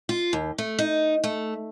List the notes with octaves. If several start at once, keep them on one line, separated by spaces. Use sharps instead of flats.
F4
D#2
A3
D#4
A3